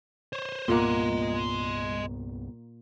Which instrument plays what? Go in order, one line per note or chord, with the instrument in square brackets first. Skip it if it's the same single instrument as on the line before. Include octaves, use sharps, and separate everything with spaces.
[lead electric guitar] C5 C#5
[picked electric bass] C2 G2 B3 [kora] A#2 A#3 F#5 [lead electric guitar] D#5 C6